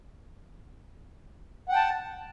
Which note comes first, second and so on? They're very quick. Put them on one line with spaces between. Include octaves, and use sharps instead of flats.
F#5 G5 A5